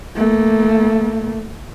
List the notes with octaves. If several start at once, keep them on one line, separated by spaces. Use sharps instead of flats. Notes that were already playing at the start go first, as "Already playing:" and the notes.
A3 A#3